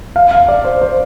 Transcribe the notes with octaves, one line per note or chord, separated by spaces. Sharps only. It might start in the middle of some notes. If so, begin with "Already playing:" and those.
F5
F5
D5
C5
C5